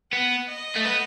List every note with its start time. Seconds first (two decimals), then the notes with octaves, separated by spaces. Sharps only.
0.13 B3 F#5
0.49 D#5
0.76 A3
0.85 B3